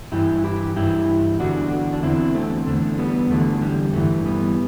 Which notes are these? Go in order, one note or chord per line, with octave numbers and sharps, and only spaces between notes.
G2 E3 E4 G4
E4 G4
G2 E3 E4 G4
E2 D3 D4 F#4
D4
E2 D3 C4 E4
A3 C4
E2 D3 A3
G3 B3
E2 D3 A3
G3
G2 E3 A3
G3 B3